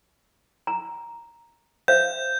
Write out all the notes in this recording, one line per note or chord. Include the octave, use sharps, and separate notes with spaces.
A#5
C5 E5 F5 G6